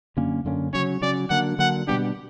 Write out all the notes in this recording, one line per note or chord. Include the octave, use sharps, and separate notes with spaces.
F#2 D3 A#3 C#4
F#2 D3 A#3 C#4
C#3 F#3 C#4 C#5
C#3 F#3 C#4 D5
D3 F#3 A#3 D4 F#5
D3 F#3 A#3 D4 F#5
B2 G3 B3 D4 G4